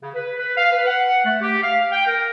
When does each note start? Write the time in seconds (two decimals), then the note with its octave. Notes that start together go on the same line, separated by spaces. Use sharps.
0.02 C#3
0.15 B4
0.39 B4
0.57 F5
0.71 B4
0.86 F#5
1.25 A3
1.42 G4
1.63 F5
1.92 G5
2.06 A#4